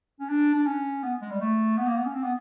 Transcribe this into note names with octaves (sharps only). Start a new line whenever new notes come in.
C#4
D4
D4
C#4
B3
G#3
G3
A3
B3
A#3
B3
C#4
C4
B3